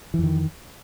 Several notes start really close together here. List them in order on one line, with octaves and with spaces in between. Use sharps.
E3 F2 D#3